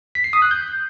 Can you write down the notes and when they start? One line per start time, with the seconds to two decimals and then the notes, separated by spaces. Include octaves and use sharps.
0.15 B6
0.24 C7
0.33 D#6
0.42 F#6
0.51 G6